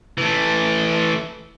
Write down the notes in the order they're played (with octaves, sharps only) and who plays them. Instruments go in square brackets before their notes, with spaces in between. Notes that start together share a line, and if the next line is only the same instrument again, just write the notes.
[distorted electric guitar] E3 A3